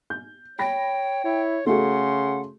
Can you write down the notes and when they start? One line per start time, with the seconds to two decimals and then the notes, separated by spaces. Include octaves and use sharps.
0.10 G6
0.59 C#5 G5 B5 A#6
1.25 E4 C#5
1.67 C#3 A3 F#4 G#4 F#5 C6